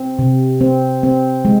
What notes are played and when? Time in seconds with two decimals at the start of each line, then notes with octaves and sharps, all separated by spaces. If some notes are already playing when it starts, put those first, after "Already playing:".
Already playing: C4
0.19 C3
0.61 C4
1.03 C4
1.45 G#3